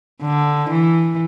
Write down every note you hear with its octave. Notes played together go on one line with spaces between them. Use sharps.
D3
E3